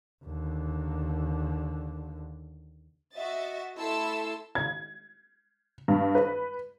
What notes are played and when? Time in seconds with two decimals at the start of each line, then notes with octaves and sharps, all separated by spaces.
0.24 D#2 D3
3.15 F#4 D#5 E5 A6
3.77 A3 E4 A4 A5 C6 E6
4.55 G#6
5.88 G2
6.15 B4